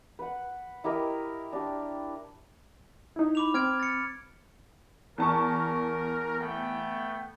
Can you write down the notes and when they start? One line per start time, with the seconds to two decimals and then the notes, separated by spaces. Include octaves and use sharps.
0.19 B4 F#5
0.84 E4 G4 A#4 D#5
1.53 D4 G4
3.16 D#4 E4
3.35 B5 D6 F7
3.54 C4 F6 G#6 D7
3.80 A6 C#7
5.18 E2 A#4 A5 C#6
6.39 A3 B3 G5